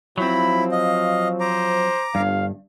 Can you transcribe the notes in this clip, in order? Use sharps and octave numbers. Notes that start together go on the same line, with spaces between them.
F3 F#3 C4 E4 B5
D#5 F5
C5 A#5 D6
G1 G2 F5